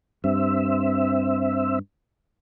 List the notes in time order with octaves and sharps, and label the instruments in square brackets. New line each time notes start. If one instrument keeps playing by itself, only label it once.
[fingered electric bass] G2 [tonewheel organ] C4 E5